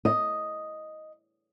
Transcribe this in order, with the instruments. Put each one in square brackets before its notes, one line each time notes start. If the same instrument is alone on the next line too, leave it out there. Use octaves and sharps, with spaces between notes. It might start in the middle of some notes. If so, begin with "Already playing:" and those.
[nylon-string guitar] D#5